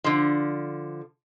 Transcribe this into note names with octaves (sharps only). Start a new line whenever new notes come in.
D3 F3